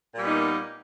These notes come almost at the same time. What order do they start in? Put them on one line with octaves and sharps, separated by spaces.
A#2 G3 B3 D#4 A#3